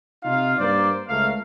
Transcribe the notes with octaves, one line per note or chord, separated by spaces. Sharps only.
C3 D#4 F4 F5
G2 A#3 C5 D5
C#2 A3 A#4 F5